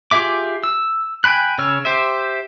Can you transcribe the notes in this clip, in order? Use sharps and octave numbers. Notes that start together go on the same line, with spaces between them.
F4 G4 G#4 E5 D6
E6
G5 G#5 B5 F#6
C#3 C#5 E6 F6
G4 C5 E5